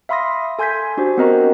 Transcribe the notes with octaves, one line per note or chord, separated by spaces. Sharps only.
E5 F5 B5 C6 D#6 A#6
A4 G#5 C6 G6 G#6 B6
D4 F#4 G4 C5
B3 C4 F#4 A#4 D#5 A#5